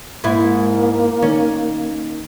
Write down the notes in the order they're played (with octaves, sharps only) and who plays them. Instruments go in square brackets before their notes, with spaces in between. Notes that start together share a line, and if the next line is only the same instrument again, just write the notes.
[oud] G#2 E4 [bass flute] A#3
[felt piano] D#3 [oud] C#4